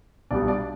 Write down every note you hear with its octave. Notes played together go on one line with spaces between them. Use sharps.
B1 B2 G3 B3 D4 D5
D4 D5